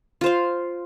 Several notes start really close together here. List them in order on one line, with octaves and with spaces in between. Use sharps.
F4 C5 F5